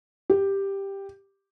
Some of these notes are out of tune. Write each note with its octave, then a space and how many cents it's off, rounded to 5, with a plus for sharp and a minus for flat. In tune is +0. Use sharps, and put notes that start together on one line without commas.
G4 +5